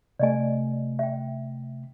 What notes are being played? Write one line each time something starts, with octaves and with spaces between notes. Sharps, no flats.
C3 A3 D5 D#5 G#5
E5 G5